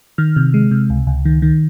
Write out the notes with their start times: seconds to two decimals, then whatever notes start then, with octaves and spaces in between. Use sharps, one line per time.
0.18 D#3 F6
0.36 C3
0.54 G#3
0.71 C3
0.90 C#2
1.07 C#2
1.25 D#3
1.42 D#3